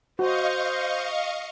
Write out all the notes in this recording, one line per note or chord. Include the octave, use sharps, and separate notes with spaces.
F#4 C5 D#5 F5 C#6